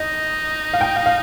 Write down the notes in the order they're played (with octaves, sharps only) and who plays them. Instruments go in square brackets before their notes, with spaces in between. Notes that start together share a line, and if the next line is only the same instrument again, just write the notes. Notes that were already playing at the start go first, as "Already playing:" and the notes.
Already playing: [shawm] D#4 [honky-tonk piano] D#5
[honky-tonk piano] F5
G5
F5
F5